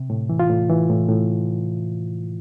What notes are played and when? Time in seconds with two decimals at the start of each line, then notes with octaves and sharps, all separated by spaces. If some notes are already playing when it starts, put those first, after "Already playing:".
Already playing: C3
0.10 A2
0.29 E3
0.40 F4
0.50 A2
0.70 E3
0.90 A2
1.09 A2